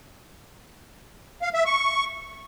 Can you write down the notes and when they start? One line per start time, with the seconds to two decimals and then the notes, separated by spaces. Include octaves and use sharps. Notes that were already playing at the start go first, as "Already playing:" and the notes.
1.42 F5
1.54 E5
1.66 C#6